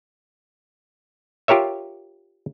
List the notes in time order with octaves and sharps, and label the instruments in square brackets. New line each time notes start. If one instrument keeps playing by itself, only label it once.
[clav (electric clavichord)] F4 G4 A#4 C#5 E5